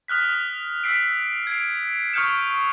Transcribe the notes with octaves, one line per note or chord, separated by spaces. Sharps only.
D#6 F6 F#6 B6
D#6
E6 B6 C7 D7
G#6 C7 D7
C#6 D#6 F6 G6 C#7 E7